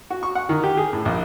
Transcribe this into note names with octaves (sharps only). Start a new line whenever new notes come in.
F#4
C#6
F#5
D#3
G4
G#4
A2
A#1